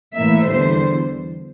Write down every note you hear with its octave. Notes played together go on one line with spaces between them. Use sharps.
A2 E3 A#3 E5
E2 D3 G3 C5